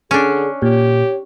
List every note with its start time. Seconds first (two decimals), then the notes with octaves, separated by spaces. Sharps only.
0.11 D3 C#4 D4 G#4
0.62 A#2 G4 C#5